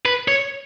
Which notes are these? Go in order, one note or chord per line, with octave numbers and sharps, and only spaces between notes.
B4
C#5